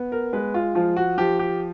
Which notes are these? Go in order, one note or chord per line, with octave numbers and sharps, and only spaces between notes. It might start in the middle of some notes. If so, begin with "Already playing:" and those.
Already playing: B3
A#4
G#3 B4
F4
F3 F4
F#4
F3 G4
G4